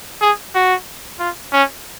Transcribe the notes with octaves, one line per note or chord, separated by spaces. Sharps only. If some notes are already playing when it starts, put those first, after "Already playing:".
G#4
F#4
F4
C#4